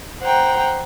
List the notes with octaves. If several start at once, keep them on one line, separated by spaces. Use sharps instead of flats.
C5 F#5 G5 A#5